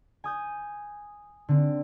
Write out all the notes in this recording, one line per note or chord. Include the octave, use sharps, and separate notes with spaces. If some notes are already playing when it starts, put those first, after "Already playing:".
G#5 D#6 G6
D3 C4